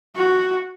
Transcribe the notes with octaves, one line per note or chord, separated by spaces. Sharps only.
F#4